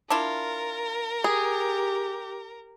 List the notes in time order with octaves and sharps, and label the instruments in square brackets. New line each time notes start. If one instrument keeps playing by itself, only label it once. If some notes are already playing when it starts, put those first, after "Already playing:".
[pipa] D4 E4 F4 [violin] A#4
[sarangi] G4 [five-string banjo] G#4